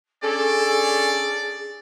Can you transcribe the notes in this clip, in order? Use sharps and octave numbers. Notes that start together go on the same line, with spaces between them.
C#4 D4 G#4 A4 D5